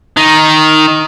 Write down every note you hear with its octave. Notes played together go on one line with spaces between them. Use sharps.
D#3